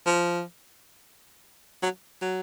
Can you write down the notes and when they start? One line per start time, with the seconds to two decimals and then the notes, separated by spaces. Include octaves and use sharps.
0.06 F3
1.83 F#3
2.22 F#3